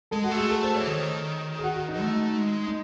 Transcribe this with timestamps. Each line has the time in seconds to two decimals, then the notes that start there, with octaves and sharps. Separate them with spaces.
0.11 G#3 A4
0.24 F#4
0.31 A3
0.37 G#4
0.50 A4
0.63 C5
0.75 C#5
0.80 E3
0.87 D#3
1.59 G#4
1.63 F#4
1.75 F#4
1.88 D#4
2.01 A3 D#4
2.38 G#3
2.67 D#4